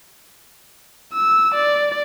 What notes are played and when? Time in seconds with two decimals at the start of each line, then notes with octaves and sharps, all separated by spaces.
1.13 E6
1.54 D5